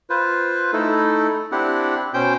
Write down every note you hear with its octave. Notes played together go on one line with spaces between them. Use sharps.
F4 B4 C5
A3 D#4 E4 A4
C4 D4 E4 G4 F#5
B2 C#4 C5 G5 G6